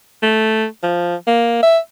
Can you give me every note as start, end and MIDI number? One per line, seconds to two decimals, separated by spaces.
0.23 0.66 57
0.83 1.15 53
1.27 1.61 58
1.63 1.79 76